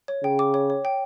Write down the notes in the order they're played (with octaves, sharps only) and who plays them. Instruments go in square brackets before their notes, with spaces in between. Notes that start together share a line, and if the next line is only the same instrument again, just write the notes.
[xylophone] C#5
[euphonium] C#3 [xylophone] G5
[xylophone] D6
C#5
C#5
G5